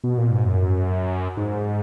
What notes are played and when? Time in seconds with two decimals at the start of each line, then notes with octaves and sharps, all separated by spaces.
0.04 B2
0.18 A#2
0.31 G#2
0.45 F#2
1.37 G#2